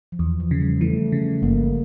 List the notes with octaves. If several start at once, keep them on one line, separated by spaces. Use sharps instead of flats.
F3
E2 E3
F3
C#3
G3
E3 A3
C#3
G1 A#3